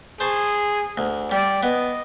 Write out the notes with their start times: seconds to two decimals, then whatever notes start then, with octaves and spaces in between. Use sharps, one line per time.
0.20 G#4 C5 A5 C#6
0.98 D2
1.31 G3 D5
1.63 B3 D#5